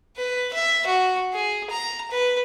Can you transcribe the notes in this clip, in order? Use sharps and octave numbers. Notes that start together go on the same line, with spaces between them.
B4
E5
F#4
G#4
A#5
B4